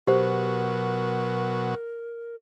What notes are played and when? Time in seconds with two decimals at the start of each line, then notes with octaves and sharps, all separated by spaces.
0.07 B2 F#3 G4 A#4 C5